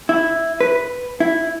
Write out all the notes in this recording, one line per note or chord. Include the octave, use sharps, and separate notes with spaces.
E4
B4
E4